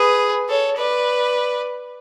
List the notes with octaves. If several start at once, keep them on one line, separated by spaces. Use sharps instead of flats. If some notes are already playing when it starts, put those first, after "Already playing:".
Already playing: G#4 B4
A4 C#5
B4 D5